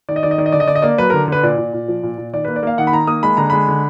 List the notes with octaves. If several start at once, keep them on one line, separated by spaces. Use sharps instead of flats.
D#3 D5
D#5
D#3 D5
D#5
D#3 D5
D#5
D3 D5
D#5
D3 D5
D#5
A#3 D5
F#3 B4
D3 A#4
D3 B4
A#2 D5
A#2
A#2
F3
A#2
A#2
D#3 D5
A#3 B4
D5
A#3 F5
D#3 F#5
B5
D#3 A#5
A#3 D#6
G#3 B5
D3 A#5
G#3 B5
D3